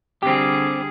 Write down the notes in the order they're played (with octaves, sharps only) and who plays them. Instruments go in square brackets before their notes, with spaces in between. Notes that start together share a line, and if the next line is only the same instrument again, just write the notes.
[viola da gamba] D3 G3 G#4 [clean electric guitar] C4 G4